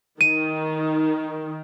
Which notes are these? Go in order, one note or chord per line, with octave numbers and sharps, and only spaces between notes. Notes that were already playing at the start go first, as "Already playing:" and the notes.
D#3 D#7